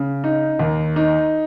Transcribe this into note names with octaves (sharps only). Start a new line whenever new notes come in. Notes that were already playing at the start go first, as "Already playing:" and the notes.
Already playing: C#3
D#4
D#2
D#4